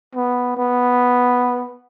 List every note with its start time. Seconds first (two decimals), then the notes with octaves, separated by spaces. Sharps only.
0.15 B3
0.57 B3